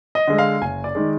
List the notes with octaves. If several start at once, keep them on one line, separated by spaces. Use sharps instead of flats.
D#5
D3 G#3
F5
F#1 G#5
D5
D#3 G#3